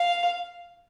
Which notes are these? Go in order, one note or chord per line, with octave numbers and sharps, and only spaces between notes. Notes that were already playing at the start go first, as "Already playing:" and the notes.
Already playing: F5